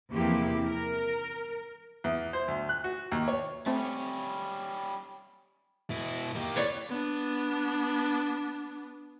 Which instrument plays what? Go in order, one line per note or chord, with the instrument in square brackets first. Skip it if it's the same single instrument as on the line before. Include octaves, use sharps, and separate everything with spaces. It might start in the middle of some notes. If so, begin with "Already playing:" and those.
[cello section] E2 C3 F3 A#3 E4 G4
A#4
[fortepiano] E2
C5
D2
F#6
F#4
D#2
C#5
[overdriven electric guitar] G3 C#4 [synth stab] A3 C4
[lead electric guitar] B2 E4
A#3 G4
[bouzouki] E3 C#5 D5
[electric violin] B3 D4